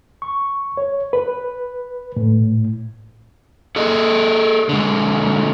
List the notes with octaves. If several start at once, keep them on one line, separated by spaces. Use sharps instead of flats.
C#6
C#5
B4
A2
G#4 A4 D#5
D3 G#3